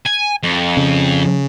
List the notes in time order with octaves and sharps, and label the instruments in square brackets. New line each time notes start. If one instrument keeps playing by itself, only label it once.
[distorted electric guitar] G#5
F2
[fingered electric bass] C#3